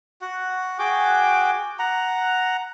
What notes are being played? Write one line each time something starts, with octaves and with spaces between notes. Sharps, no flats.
F#4 F#5
F#4 G#4 G5 D6
F#5 A#5